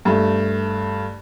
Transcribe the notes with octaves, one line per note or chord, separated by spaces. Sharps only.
G2 A3